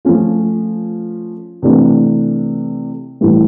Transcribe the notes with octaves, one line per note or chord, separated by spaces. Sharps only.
F3 A3 C#4 F4
C3 E3 A3 D4
A2 E3 G3